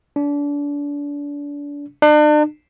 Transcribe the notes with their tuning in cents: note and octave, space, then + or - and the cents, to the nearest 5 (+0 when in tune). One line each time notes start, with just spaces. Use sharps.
D4 -30
D4 +40